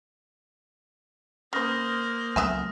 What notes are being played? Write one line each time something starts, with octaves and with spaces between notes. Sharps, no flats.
C#3 A#3 B4 C5 D#6 F6 A#6
C#2 F#3 A3 B3 E5 G#5